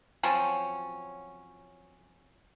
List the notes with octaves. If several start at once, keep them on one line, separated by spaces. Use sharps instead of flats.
F3 F#3 C4 C#4